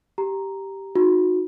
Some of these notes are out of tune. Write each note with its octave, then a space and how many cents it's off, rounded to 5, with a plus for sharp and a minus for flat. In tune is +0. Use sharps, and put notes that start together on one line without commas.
G4 -5 A#5 +0
D#4 +0 F#4 -30